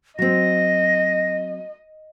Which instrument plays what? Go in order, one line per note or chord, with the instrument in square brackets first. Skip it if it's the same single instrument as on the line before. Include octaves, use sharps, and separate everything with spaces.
[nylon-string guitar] F#3 C4 [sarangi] D#5 [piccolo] A#6